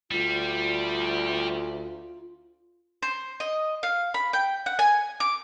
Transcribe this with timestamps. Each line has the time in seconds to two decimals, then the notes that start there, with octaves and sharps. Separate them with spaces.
0.11 D2 G3 F4
3.02 C5
3.40 D#5
3.83 F5
4.14 B5
4.33 G5
4.66 F#5
4.79 G#5
5.20 D6